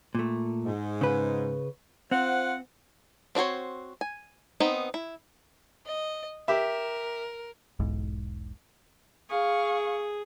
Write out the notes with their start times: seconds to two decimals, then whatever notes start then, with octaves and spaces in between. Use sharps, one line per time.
0.15 A#2 A3
0.65 G#2
1.01 C#3 B4
2.11 C4 F4 C5 F#5
3.35 C4 D4 F#4 C5 C#5
4.01 G#5
4.60 B3 C4 D#4
4.94 E4
5.86 D#5
6.48 G4 A#4 E5
7.79 E1 B1 G#2
9.30 G#4 F5 C#6